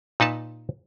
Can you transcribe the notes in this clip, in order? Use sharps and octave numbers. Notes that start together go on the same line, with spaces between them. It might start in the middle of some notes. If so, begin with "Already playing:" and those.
A#2 D#4 B4 A5